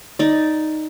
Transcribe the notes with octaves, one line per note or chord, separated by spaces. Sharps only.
D#4 D5